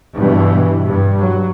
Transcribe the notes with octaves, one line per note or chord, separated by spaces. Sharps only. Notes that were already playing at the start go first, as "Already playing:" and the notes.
G2 B2 E3
G2
F#3